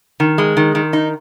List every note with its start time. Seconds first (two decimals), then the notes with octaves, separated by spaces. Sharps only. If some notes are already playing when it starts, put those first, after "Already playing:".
0.20 D#3
0.38 G#3
0.57 D#3
0.75 D#3
0.93 D#4